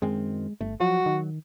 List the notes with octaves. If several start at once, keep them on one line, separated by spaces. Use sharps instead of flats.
F#2 D#3 G#3 C4
G1 A3
F3 F#3 F#4
D#3